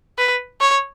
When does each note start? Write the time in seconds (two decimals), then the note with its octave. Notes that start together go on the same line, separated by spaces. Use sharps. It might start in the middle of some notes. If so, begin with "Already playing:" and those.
0.18 B4
0.61 C#5